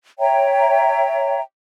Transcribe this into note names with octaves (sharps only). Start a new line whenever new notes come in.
C#5 E5 G5 A#5